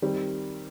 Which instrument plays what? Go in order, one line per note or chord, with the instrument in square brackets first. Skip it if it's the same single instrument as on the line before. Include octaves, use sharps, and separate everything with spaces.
[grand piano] D#3 G3 C4 G4